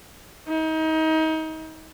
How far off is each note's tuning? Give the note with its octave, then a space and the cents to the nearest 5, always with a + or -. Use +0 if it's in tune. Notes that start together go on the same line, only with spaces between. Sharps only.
D#4 +30